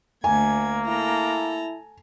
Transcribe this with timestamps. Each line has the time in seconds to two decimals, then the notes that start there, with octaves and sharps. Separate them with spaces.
0.24 D2 A#3 G#5 G#6
0.87 E4 A4 A#5